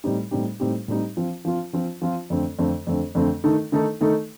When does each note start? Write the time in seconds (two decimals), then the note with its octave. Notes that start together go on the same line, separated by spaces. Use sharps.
0.04 A2 G3 C4 D#4 G4
0.31 A2 G3 C4 D#4 G4
0.60 A2 G3 C4 D#4 G4
0.88 A2 G3 C4 D#4 G4
1.17 F3 C4 F4
1.45 F3 C4 F4
1.73 F3 C4 F4
2.02 F3 C4 F4
2.30 F2 D3 A3 C4
2.59 F2 D3 A3 C4
2.87 F2 D3 A3 C4
3.15 F2 D3 A3 C4
3.44 D#3 A3 D#4 A4
3.72 D#3 A3 D#4 A4
4.01 D#3 A3 D#4 A4